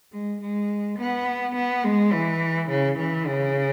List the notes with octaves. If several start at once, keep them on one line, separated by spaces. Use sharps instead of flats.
G#3
G#3
B3
B3
G#3
E3
C#3
E3
C#3